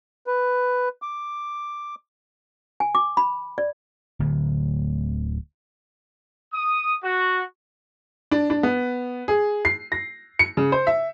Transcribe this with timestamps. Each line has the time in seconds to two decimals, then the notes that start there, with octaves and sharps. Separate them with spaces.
0.27 B4
1.02 D6
2.80 G#5
2.95 D6
3.17 B5
3.58 D5
4.19 D1 D2
6.53 D#6
7.04 F#4
8.31 D4
8.50 D4
8.63 B3
9.28 G#4
9.65 C7
9.92 A#6
10.39 C#7
10.57 C#3
10.72 C5
10.87 E5